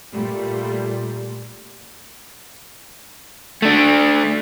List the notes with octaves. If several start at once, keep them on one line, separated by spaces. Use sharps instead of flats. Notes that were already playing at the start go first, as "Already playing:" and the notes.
A#2 G3 A3
A3 D4